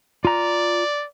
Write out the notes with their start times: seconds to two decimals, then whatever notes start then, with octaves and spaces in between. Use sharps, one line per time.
0.25 F4 D5 A#5